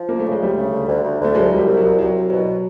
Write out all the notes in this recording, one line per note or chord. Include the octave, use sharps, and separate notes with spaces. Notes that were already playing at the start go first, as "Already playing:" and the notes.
Already playing: F3
D2 A#3
C#3 A3
G#3
D2 G3 A3
C#3
D2
D2
D2
D2 A3
C2 F#3 G#3
C2
G3
C2
F#3
C2
C2 F#3
C2
B2 F#3